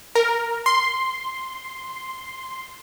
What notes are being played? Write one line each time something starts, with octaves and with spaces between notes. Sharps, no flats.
A#4
C6